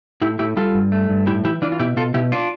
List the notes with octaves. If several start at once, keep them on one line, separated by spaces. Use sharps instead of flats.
A2 E4 G4
A2 E4 G4
G3 F4 A4
G2
A3
G2
A2 E4 G4
E3 E4 G4
E3 D4 F4
F4
B2 E4 G4
B2 F4 A4
B2 E4 G4
D4 F4